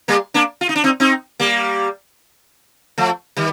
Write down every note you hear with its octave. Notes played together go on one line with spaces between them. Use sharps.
G3 A#3
A#3 D4
F4
D#4
D4
C4 D#4
C4 D#4
G3 A#3
F3 A3
D#3 G3